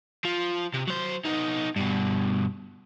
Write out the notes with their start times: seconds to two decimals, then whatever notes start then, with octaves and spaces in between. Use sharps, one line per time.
0.25 F3
0.74 C3
0.88 F#3 C5
1.25 B3 D#4
1.76 G2 B2